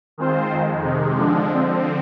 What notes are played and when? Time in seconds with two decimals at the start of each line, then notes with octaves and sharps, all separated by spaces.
0.18 D#3 G#3 C4 F4 C5
0.51 F2 D#3 G#3
0.84 C3 D#3 G#3
1.17 D3 F3 G#3 D4
1.51 D3 F3 C4